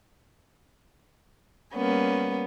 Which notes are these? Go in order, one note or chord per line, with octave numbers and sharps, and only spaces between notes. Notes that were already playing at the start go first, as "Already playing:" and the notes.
G3 A#3 B3 C#4